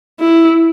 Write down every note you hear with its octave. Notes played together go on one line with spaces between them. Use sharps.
E4